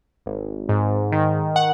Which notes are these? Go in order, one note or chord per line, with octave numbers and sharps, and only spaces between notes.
G#1
G#2
D#3
F#5